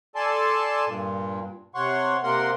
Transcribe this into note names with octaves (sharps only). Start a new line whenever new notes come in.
A4 D5 G#5 A5 C6
G2 A#2
C3 C#5 F#5 C6 C#6
C3 A#3 A#4 F#5 C6